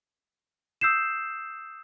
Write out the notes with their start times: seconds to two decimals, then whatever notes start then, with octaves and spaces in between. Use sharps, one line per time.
0.81 D#6 E6 G6 C7 E7